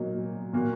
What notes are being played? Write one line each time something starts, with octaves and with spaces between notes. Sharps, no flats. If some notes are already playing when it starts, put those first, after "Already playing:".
Already playing: A#2 F#3 A#3 D#4
A#2 A#3 F#4